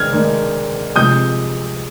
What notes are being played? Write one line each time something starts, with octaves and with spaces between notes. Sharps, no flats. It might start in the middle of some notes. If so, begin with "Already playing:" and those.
Already playing: D#3 G#3 D4 F6 G#6
D#3 G#3 D4
C3 F3 G#3 D#6 G6